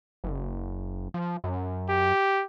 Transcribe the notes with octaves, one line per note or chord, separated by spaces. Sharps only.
F#1
F3
F#2
G4